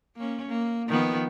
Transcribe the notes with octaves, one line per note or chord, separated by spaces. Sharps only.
A#3 C#4
A#3
D#3 F3 B3